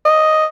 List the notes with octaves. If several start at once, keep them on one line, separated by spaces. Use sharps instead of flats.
D#5